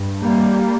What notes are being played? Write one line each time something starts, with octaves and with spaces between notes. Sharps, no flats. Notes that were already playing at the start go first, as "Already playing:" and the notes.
Already playing: G2
G3 A#3